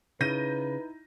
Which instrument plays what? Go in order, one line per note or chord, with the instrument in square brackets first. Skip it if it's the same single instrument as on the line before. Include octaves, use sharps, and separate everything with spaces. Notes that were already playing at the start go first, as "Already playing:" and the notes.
[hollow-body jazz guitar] C#3 [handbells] D#4 E4 [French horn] B4 [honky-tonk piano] G6 A#6 D#7